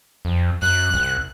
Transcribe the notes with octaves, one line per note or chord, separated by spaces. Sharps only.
F2
F#2 F#6
C2